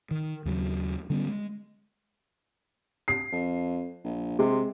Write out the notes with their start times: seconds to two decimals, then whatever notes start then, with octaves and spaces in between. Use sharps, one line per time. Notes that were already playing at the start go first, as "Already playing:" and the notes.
0.11 D#3
0.45 D#2 C#3 F#3
1.10 D3 G3 B3 C#4
1.28 G#3
3.08 C7
3.32 F2
4.04 A#1
4.39 C3 G#3